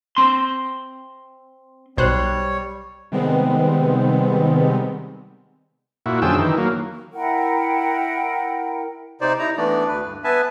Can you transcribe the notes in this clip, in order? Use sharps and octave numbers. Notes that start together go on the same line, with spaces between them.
C4 C6
B1 G3 C5 C#5 F#6
C3 D#3 G3 G#3 B3 C4
A#2 E4 F#4
F#2 D3 F3 G#4 G5 E6
D#3 E3
F#3 A#3
E4 A#4 F#5 G5
C3 D#4 C5 D5
D#4 E4 A#5
E3 A3 B3 D4 D5
D2 B4
G2
B3 B4 E5 G#5 A5